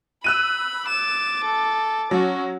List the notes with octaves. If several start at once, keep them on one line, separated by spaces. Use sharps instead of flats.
B5 E6 F#6 D#7
D6 A6 E7
A4
F#3 C#4 F#4